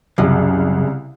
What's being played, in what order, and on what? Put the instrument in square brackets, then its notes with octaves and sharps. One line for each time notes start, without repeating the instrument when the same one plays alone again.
[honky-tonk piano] C2 C#3 [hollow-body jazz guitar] F#2